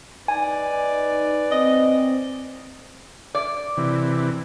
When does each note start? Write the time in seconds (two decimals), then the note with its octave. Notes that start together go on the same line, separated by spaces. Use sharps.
0.28 D#4 B4 D5 G#5
1.52 C4 D#5
3.35 D5
3.78 C3 E3